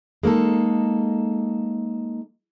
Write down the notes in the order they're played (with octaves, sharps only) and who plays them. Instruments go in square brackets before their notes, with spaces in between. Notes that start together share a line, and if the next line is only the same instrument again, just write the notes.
[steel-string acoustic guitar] G#3 A#3 D#4 A4